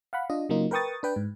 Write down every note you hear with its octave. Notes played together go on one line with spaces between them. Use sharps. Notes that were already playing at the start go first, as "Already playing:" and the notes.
F5 F#5 B5
D4 F4 D#5
C#3 F#3 A#3 D#4 F4
A#4 B4 G5 C#6 D#6 A6
D4 B4 G5
G#2